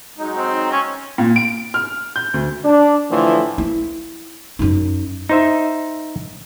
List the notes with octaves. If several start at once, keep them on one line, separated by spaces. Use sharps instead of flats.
F#3 G#3 D#4
C4
C#4
A#2
D7
F6
G6
D2
D4
A2 D3 E3 F3
E4
F#2 D#4
D#4 C5 E5